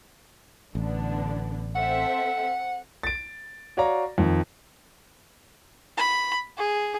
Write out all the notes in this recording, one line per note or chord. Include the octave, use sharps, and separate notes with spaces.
A1 D3 B3 D4
C4 A4 E5 F#5
A6 D7
F#4 C#5 D5 F5 A#5
F2 D#3
B5
G#4